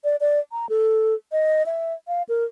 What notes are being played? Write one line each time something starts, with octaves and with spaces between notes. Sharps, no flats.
D5
D5
A#5
A4
D#5
E5
F5
A#4